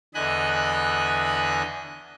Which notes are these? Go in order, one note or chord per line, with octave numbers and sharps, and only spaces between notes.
E2 D3 D#5 G#5 B5 F#6